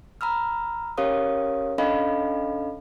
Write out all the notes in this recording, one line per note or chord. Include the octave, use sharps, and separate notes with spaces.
A#5 B5 E6 F6
C#4 G4 A#4 C#5 F5 D#6
C#4 D4 A4 D#5 F5 B5